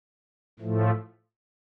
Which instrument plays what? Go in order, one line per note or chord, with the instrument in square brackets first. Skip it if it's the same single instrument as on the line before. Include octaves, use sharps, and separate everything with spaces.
[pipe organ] A2 F3 A3